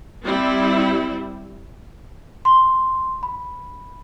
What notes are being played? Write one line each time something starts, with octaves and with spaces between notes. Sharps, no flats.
G3 C4 E4
C6
B5